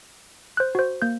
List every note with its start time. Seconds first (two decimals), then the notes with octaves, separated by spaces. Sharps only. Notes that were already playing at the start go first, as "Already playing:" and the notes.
0.57 C5 F#6
0.75 F#4 C5
1.02 A#3 G6